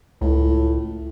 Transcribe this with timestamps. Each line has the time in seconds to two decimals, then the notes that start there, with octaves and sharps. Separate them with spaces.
0.21 C#2 A2